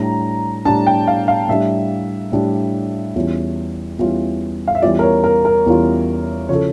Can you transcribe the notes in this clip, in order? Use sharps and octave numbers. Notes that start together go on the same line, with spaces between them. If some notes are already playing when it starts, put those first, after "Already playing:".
Already playing: A2 G3 D4 A#5
A2 G3 D4 A5
G5
F5
F5
A2 G3 D4 E5
A2 G3 D4
E2 E3 G3 C#4 F4
E2 E3 G3 C#4 F4
F5
E5
E2 E3 G3 C#4 F4 D5
A#4
C#5
A#4
A#4
E2 E3 G3 C#4 F4
C#3 F3 C#4 E4 A4 C#5